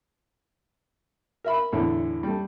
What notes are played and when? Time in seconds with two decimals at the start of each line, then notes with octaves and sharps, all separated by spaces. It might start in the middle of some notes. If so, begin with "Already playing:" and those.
1.44 A#4 E5 B5
1.72 E2 A2 D3 E3
2.23 G3 A3